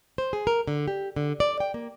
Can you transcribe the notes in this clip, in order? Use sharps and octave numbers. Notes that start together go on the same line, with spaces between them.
C5
G#4
A#4
D3
G4
D3
D5
G5
A#3